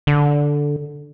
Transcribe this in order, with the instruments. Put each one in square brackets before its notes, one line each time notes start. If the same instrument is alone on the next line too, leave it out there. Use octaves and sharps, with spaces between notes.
[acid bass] D3